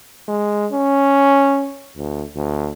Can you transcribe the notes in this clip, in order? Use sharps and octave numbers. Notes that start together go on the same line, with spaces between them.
G#3
C#4
D2
D2